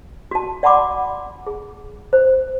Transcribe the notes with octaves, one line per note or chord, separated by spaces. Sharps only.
F#4 A5
D5 F#5 A5 B5 C6 D6
G#4
C5